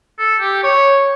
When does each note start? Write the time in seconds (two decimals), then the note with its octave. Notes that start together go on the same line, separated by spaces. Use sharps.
0.19 A4
0.40 G4
0.63 C#5